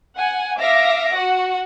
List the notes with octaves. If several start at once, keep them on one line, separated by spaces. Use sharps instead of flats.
F#5 G#5
E5 F5 D6 A#6
F#4 F#5